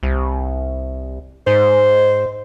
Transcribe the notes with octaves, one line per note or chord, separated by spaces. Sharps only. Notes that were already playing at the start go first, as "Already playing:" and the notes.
C2
G#2 C5